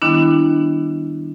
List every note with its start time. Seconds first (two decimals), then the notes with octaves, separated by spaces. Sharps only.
0.02 D#3 G3 B3 D4 E4